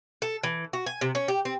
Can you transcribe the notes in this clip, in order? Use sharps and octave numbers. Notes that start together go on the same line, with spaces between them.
A4
E3
F#4
G#5
C3
C#4
G4
C4